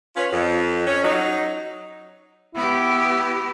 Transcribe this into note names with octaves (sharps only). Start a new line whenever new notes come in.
C#4 F4 B4 C#5
F2
C#4
F#3 D#4
B3 E4 G4